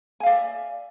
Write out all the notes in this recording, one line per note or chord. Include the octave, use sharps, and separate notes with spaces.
D5 E5 F5 G#5